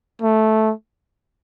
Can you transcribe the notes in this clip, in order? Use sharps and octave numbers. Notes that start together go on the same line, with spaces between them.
A3